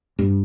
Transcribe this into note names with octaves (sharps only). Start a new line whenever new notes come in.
G2